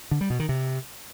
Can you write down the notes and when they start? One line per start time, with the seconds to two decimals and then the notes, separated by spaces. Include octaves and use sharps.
0.11 D3
0.21 G3
0.30 B2
0.39 D#3
0.49 C3